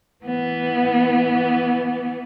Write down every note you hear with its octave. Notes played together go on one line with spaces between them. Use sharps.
E3 B3